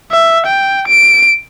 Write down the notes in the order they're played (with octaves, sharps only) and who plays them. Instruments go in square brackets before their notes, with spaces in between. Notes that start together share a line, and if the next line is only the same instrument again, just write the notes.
[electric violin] E5
G5
D7